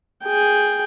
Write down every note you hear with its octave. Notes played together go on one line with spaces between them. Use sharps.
G#4 G5